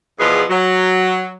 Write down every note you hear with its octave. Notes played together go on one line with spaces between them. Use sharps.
E2 B2 F3 G#4 B4
F#3